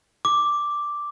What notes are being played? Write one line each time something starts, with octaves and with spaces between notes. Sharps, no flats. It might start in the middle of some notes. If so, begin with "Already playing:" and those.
D6